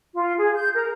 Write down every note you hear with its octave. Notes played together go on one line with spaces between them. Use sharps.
F4
G#4
G6
A#4